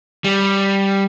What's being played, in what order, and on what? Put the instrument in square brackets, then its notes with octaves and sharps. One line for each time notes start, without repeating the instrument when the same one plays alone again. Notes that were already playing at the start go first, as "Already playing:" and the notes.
[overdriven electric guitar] G3